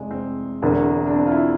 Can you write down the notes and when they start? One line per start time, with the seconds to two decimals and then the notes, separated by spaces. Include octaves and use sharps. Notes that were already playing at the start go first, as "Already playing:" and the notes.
Already playing: F1 E2 G#3
0.11 C4
0.62 E1 E2 D3
1.06 D4
1.15 C4
1.26 F4
1.32 E4